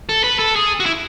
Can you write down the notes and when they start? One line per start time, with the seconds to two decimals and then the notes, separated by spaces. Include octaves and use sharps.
0.09 A4
0.24 B4
0.39 A4
0.56 G#4
0.80 F#4
0.86 E4